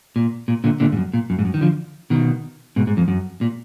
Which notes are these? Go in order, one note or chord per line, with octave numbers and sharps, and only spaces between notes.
A#2
A#2
A#2 D3
A#2 D3
G#2
F#2
A#2
F#2
G#2
F#2
D#3
D3 F3
B2 D#3
G#2 B2
G#2
F2
F#2
A#2